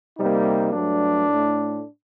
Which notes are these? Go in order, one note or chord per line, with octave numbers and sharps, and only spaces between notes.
C3 G3 A#3 D#4
G2 F#3 A3 D4
A2 A3